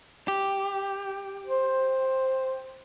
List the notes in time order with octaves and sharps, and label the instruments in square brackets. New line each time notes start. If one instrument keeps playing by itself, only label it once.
[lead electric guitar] G4
[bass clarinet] C5